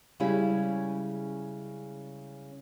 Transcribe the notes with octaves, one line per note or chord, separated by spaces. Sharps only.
C#3 G3 G#3 C#4 E4 G#4